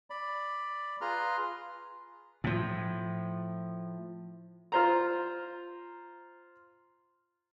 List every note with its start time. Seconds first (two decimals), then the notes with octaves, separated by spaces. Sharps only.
0.10 D5 B5
1.01 F4 G#4 B4 A#5 C6 F6
2.44 A2 F3
4.72 F4 C5 A#5